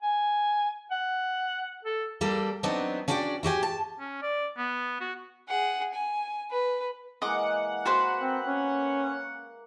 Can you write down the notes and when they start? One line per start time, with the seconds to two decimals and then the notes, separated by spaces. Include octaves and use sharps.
0.03 G#5
0.91 F#5
1.85 A4
2.21 G3 A#3 A4
2.63 F#3 B3 C4 D4 D#4
3.08 C#4 D4 F#4 D5 F#5 G5
3.43 E4 F#4 G4 G#5
3.63 A5
4.00 C#4
4.22 D5
4.58 B3
5.00 F#4
5.48 G#4 F#5
5.94 G#5
6.51 B4
7.22 E3 G#3 A#3 D#5 F#5 D6
7.85 A#3 F#4 B4 C5 C#6
8.20 C4
8.45 C#4